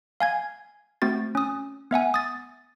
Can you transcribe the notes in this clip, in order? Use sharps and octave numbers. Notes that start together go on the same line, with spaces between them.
F5 G#5 G#6
A3 C4 F#4 A6
C#4 D#6
B3 E5 F#5 G#5
D#6 A6